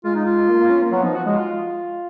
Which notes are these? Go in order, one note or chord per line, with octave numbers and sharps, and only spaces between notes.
G#3 F4
D#4
F4
A#3
A#3
C#4
A#3
F#3 B3
F3 D#4
F#4
G#3 F#4
F4